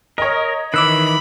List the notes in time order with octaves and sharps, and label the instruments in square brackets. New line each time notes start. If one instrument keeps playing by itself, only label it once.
[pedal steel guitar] A#4 [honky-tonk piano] C#5 D#5
[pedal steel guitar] D#3 E3 [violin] B5 [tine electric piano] D6 E6 F#6